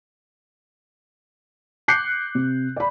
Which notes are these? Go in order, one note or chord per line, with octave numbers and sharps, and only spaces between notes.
D6 F#6 G6 C7 C#7
C3
D5 B5